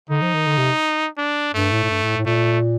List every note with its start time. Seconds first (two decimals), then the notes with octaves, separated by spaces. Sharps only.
0.10 D3 D#4
0.22 F3
0.34 D#3
0.46 D3
0.58 C3
1.18 D4
1.54 G2 A3
1.72 A2
1.83 A2
1.90 G2
2.03 A2
2.17 A2
2.26 A#2 A3